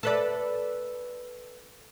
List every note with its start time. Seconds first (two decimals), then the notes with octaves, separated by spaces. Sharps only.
0.03 A4 B4 D5